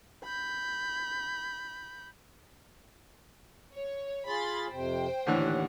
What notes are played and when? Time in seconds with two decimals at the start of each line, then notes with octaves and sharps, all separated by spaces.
0.24 B5 G6
3.74 C#5
4.27 F4 G#4 B5 C6 A6
4.70 F2 C3 C5 G5
5.27 D#2 A2 D3 E3 F#5